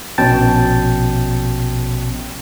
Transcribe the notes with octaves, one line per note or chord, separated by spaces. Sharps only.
A#1 B2 C#4 G5 A5 A6